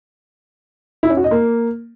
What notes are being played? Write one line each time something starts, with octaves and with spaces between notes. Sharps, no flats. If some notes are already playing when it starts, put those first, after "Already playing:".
E4
C#4
F#4
D#5
A#3